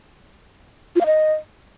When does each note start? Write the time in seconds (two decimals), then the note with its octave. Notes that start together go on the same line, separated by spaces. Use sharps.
0.96 F4
1.01 F5
1.06 D#5